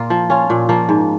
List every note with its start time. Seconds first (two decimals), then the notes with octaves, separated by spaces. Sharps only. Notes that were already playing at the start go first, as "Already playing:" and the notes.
Already playing: A#2 A#3 F4
0.10 F3
0.30 C#4 F4
0.50 A#2
0.69 F3 A#3
0.89 G#2